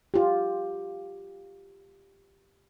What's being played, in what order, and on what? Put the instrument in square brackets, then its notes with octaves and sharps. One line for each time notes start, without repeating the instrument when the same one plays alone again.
[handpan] F4 G4